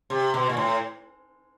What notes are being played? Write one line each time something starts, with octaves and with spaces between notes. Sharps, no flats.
C3
B2
A#2
A2